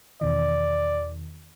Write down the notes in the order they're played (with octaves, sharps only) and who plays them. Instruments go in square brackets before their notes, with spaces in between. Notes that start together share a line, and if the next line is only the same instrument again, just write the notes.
[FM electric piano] E2 B2 D#3 [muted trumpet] D5